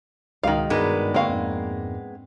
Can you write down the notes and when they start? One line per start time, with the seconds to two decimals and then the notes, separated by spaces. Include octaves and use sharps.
0.43 C#2 G#2 B2 D#3 D#4 F5
0.70 G2 G#3 B3 D4 D#4 A#4 B4
1.14 D3 A#3 C4 F5 C#6
1.29 F2 G#2